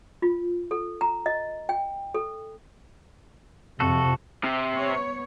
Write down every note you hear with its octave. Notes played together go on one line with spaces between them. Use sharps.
F4
A4
A#5
D#5
G5
A4
F2 C3 F#4 A4
C3
B3 C#5